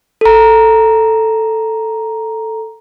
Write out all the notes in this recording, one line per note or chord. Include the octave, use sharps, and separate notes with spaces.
A4 A#5